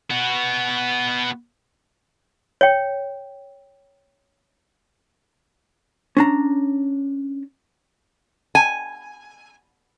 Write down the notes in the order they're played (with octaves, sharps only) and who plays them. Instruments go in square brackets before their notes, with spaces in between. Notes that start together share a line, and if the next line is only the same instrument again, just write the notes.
[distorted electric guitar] B3 F#4
[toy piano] C#5 G5
[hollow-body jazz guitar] C#4 D4 A#5
[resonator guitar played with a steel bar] G#5